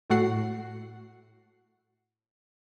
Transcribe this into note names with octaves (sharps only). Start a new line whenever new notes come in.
A2 A3 F#4 F#5 C7